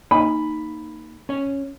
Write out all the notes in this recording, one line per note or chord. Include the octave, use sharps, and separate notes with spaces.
A#3 D#4 G#5 B5
C#4 C#5